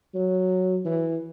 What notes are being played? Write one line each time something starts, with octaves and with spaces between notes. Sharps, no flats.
F#3
E3